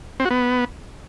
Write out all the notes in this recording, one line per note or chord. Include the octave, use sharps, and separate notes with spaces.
C4
F#4
B3